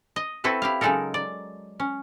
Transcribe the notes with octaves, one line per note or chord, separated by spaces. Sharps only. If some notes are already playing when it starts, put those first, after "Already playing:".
D#5
C4 E4 F#4 A4 B4
E4 G4 F5
C#3 F#3 G#3 D#4 A4 A#4
D5
C#4